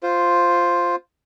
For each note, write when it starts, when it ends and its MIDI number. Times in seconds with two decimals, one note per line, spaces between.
0.03 0.96 65
0.03 0.96 72